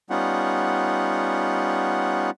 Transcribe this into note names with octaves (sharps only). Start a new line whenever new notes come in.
G3 B3 C#4 D#4 F4 F#5